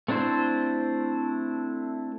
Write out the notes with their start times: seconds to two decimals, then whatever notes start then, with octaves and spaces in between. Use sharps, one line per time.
0.08 A3 C4 D4 E4 C5